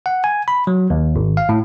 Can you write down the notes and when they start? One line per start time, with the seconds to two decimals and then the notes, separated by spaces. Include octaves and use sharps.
0.06 F#5
0.24 G#5
0.48 B5
0.67 F#3
0.90 D#2
1.16 G#1
1.37 F5
1.49 A2